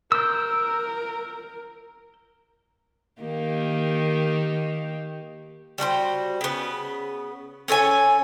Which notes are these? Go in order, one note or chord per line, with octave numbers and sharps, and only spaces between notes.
A#4 E6 G6
D#3 A#3 G4
G3 F#4 A4 C5
C#3 B3
C#4 A4 C#5 G#5